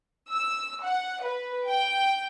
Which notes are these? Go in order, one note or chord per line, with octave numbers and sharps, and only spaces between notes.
E6
F#5
B4
G5